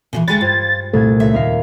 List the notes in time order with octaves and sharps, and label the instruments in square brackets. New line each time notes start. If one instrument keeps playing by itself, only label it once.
[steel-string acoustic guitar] A#2 C#3 E3
[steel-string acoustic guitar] D2 G#3 C#5 [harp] G5 B5 F#6 [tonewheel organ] A6
[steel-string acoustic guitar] G2 [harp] F4 C5 G#6
[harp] C2 A#2 G#6 [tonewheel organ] A3
[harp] C#2 [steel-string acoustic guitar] E5
[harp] D#2 A#4 F5